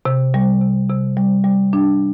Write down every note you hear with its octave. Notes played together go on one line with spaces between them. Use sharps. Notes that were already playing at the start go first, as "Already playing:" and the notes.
C3
G3
C3
C3
G3
G3
D4